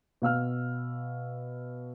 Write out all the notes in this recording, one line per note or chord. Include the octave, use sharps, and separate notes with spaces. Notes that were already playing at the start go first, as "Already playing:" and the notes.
B2 F5 E6 F6